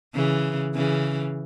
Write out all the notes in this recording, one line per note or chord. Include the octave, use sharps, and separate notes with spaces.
C#3 E3
C#3 E3